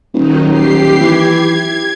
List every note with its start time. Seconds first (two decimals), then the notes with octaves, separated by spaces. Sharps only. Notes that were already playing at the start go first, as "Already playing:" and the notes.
0.14 D#1 D#3 F#3 D#4
0.49 G4 C7
1.01 E3 G#6